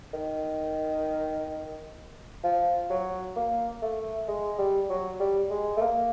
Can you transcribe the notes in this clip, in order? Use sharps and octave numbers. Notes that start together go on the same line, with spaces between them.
D#3
F3
F#3
A#3
A3
G#3
G3
F#3
G3
G#3
A3
A#3